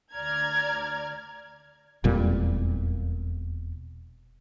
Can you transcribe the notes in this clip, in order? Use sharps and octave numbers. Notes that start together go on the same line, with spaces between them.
D2 D5 A#5 F6 G#6
E1 F2 A#2 G3